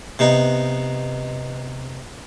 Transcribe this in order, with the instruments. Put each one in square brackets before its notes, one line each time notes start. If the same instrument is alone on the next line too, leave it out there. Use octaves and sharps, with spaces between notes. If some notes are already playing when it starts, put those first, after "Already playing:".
[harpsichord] C3 B3 D#4